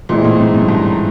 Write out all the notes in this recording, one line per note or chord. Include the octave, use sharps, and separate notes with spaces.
A#2 E3 G#3 C4 E4
A2
G#2
F#2
G2